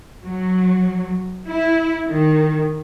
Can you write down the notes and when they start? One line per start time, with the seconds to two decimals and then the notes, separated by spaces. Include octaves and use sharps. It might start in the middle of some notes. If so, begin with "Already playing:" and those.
0.23 F#3
1.47 E4
2.09 D#3